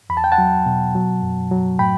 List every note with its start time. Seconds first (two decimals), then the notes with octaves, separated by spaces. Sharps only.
0.10 E2 B5
0.17 A5
0.24 G5
0.32 F#5 A5
0.38 F#3
0.66 B2
0.95 F#3
1.22 F#2
1.51 F#3
1.79 A2 G5 B5